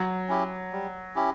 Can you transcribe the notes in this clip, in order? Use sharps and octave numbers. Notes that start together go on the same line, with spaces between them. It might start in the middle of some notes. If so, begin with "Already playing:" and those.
Already playing: F#3
C#4 E4 G4
G3
C#4 E4 G4